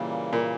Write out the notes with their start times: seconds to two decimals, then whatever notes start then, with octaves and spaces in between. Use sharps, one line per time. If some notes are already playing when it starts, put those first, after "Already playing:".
Already playing: A#2 C#3 E3 G3 A#3
0.33 A#2